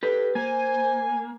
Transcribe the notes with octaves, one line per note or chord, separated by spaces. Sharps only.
G4 A4 B4
A#3 C5 G#5